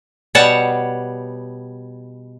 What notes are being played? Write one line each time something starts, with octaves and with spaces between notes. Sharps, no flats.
B2 G3 C#5 F#5 A5